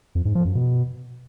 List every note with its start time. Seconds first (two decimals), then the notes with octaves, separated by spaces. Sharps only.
0.15 F2
0.25 G#2
0.35 F3
0.45 F#2
0.55 B2